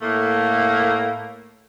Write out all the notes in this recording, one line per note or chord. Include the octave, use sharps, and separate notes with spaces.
A2 A3 A#3